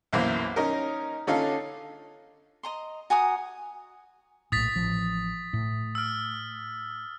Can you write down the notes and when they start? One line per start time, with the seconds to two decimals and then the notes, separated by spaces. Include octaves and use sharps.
0.13 B1 F#2 E3 A#3 C5
0.56 C#4 D#4 A#4
1.27 D3 C#4 D#4 F4 A4
2.63 D#5 A#5 C6
3.10 F#4 G#5 A#5 D#6
4.52 A#1 A2 D#6 A6 B6
4.75 A1 F3
5.53 A2
5.95 E6 F6